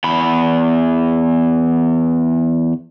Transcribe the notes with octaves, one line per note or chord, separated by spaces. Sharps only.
E2 B5